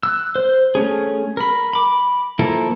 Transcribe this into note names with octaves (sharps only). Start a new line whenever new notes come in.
E6 F#6
C5
A3 C#4 G#4
A#4 B5
B5 D6
F3 A#3 E4 A4 A#4